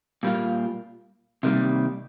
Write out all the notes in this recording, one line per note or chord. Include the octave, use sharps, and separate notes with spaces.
A#2 G3 A#3 F4
C3 D#3 G3 A#3